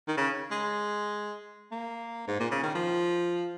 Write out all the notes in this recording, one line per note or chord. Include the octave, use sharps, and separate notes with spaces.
D#3
C#3
G#3
A#3
G#2
A#2
C#3
D#3
F3